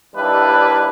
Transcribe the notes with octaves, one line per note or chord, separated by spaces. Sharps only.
D#2 G3 D4 E4 B4